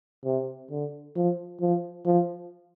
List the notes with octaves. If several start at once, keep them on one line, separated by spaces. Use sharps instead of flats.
C3
D3
F3
F3
F3